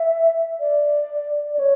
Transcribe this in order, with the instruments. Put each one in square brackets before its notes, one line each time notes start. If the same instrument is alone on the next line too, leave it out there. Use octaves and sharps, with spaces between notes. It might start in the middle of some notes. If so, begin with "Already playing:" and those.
Already playing: [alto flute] E5
D5
D5
C#5